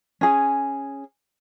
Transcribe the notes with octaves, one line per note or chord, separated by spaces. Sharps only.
C#4 G#4